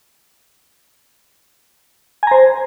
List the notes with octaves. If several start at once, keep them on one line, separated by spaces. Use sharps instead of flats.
C5 G#5 A#5